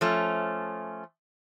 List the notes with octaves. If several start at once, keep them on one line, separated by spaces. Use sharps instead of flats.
F3 A3 C#4